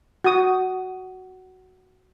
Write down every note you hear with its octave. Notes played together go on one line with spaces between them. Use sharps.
F#4 D#6